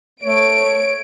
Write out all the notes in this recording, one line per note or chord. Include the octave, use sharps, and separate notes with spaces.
A3 C#5 D7